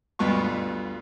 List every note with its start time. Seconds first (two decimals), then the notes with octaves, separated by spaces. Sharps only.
0.19 D2 G2 B2 B3 F4 C#6